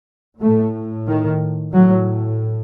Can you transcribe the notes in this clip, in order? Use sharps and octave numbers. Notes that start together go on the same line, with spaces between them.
A2 A3
D#3
A2 F#3